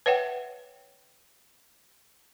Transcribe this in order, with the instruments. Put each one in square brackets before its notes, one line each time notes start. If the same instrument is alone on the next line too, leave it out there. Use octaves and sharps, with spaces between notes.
[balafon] B4 C#5 E5 F#5 G5